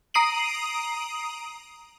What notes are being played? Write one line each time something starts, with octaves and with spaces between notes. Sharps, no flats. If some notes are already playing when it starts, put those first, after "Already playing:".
A#5 D#6 C7 D7 D#7 F#7